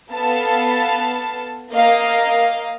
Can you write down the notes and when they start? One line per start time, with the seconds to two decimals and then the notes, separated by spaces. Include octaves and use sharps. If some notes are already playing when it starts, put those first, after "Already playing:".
0.13 B3 A4 F5 A5
1.73 A#3 D#5 F5